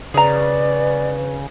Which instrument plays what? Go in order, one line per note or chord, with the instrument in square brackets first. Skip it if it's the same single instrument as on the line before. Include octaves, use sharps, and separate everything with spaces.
[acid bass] C#3 [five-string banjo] G#4 A#5 [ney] B4 [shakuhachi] D5